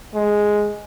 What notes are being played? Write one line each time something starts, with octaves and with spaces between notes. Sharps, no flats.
G#3